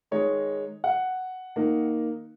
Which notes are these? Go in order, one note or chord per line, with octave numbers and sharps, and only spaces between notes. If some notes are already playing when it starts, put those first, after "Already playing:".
D#3 G#3 D#4 C#5
F#5
D#3 A#3 D#4